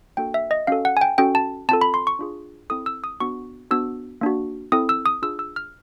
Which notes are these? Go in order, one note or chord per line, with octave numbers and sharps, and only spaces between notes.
A#3 D4 F#4 A4 G5
E5
D#5
C#4 F#4 A4 F5
F#5
G#5
G5
C#4 F#4 A4 G5
A5
C4 F4 A4 A5
B5
C6
C#6
D4 F4 G#4
C4 E4 A4 D#6
E6
D#6
B3 D4 F#4 C#6
B3 D4 F#4 E6
A#3 D4 F#4
C4 E4 A4 D#6
E6
D#6
D4 F4 G#4 E6
E6
F6